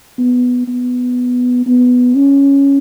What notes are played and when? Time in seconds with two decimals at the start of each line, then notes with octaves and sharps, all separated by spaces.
0.18 B3
0.68 B3
1.66 B3
2.15 C#4